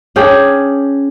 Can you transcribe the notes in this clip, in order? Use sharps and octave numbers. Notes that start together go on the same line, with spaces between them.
C#4 D4 G#4 G5